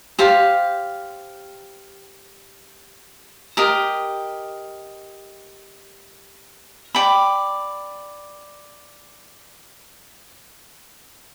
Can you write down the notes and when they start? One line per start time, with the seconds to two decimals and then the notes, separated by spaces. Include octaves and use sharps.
0.19 G4 C5 F5 A5
3.57 G4 A#4 D#5
6.95 D5 G5 B5